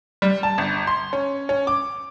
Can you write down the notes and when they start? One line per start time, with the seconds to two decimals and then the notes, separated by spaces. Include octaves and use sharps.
0.22 G3
0.43 A5
0.58 G1
0.87 C6
1.13 C#4
1.49 C#4
1.67 D6